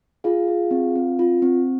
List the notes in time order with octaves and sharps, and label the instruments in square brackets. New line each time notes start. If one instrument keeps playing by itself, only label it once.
[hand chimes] F4 G#4 F5
G#4
C4
C4
F4
C4